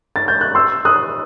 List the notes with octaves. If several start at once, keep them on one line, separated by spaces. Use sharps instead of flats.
A6
G6
F#6
C6 E6
D#6 F#6